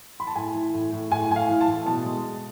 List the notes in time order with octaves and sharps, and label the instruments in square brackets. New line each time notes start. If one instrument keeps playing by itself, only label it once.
[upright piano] B5
A5
A2 G#5
E3
A2
A2
A2 G#5
A2 G#5
F5
E3
A5
A2
B2 A5
G#3
G#3